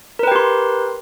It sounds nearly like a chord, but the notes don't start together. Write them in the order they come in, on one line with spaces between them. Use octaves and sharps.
A#4 B4 G5 G4 C6